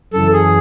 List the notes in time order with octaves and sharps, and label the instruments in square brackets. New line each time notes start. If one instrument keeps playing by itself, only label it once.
[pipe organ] F#2 C#3 E3 [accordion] A4
[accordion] G#4